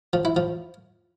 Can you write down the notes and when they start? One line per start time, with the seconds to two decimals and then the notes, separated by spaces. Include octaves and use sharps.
0.13 F3
0.25 E4
0.36 F3